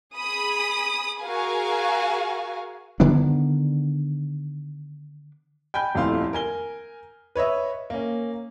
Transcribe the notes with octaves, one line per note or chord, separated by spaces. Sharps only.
G#4 B5 D#6
F#4 G#4 A#4 F5 G#5
D3 D#3 B3 D4
G5 G#5 B5 G6
D#1 F2 A3 E4 F5 C6
A#4 G#5 G7
B4 C#5 D#5 E5
A#3 C#4